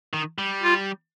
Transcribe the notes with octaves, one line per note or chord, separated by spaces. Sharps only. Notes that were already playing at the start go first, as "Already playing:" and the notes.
D#3
G3
F4